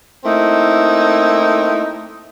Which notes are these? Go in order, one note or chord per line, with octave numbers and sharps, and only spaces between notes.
A3 A#3 C4 D#4 E4